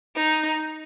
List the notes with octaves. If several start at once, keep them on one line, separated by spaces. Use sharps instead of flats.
D#4